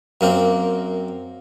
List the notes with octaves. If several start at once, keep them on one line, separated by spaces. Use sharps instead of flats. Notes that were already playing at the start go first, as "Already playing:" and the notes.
F#2 A#3 C4